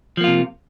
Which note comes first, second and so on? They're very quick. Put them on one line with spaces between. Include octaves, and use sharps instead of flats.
F3 A#3 F4 C3